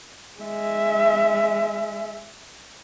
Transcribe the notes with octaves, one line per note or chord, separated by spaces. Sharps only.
G#3 E5